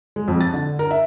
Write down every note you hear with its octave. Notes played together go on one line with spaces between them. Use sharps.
G#3
F2
A6
D3
A#4
E5